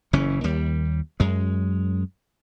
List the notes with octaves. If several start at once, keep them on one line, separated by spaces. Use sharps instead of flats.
F#1 C#3 E3 C#4
D#2 G3
F#2 G#3